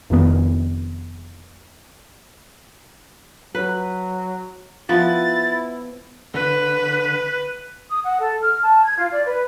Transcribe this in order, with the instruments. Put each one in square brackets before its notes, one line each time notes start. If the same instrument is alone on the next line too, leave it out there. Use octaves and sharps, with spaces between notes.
[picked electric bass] F1 F2 D#3 B3
[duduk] F#3 [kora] B4
[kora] F3 B3 [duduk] E4 [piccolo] A6
[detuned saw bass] D3 [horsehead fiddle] B4
[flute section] D#6
F#5
A4
F6
A5
G#6
F4
D5
B4